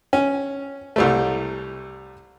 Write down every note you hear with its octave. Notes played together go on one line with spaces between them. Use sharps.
C#4
C2 G3 A3